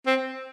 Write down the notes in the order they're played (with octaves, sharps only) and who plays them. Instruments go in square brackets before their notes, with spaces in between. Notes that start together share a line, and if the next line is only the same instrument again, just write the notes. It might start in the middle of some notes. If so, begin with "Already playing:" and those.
[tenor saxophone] C4